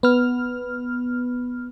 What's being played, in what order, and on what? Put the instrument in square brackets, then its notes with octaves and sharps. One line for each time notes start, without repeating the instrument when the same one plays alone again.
[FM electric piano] B3 F6